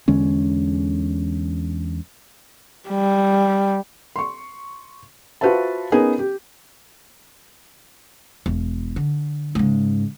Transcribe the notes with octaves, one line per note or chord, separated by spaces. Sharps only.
E2 D3 G#3 C#4
G3
C6 C#6
F4 F#4 B4 C5 E5 A5
B3 C#4 D#4 G#4 A#4
G4
E1
D3
G#2 C#3